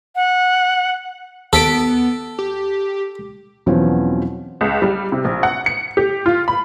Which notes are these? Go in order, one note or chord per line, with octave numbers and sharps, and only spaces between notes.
F#5
D#2 B3 A4 B6 D7
G4
E2 B2 F3 F#3 C4 C#4
C#2
G3
C3
A#1
F#5
C#7
G4
F4
B5